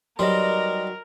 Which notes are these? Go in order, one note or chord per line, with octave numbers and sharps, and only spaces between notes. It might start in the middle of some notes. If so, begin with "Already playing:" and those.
F#3 G3 D#4 A#4 B4 D#5 C6